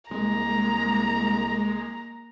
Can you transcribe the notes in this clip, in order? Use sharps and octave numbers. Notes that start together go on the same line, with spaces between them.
C2 G#3 A#3 A#5